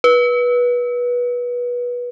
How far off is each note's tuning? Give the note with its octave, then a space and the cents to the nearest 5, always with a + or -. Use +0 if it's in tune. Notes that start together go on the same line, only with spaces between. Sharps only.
B4 -20